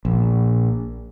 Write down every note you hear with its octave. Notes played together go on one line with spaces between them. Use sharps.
A#1